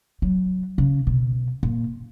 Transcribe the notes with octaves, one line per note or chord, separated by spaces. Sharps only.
F#3
C#3
B2
A#2